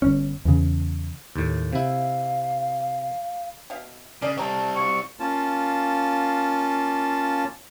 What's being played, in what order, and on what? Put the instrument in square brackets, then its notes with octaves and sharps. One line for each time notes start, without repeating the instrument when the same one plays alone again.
[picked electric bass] G1 C#4
E2 C#3
[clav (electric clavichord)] D#2 A2
[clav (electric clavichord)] C3 E4 [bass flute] F5
[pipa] B2 E5 F5
[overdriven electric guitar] C#3 [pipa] G#3 A#4 D5
[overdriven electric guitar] G3 C4 [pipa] A3 A#5 C#6
[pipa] F#3 F4 [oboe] C#6
[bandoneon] A#3 C#4 F4 A5